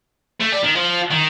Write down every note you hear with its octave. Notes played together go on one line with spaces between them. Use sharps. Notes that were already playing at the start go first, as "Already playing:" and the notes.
A3
G3
D#3
F3
D#3